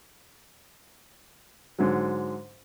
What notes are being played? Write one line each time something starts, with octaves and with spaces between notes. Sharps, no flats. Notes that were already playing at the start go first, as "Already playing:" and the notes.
G#2 D3 F#3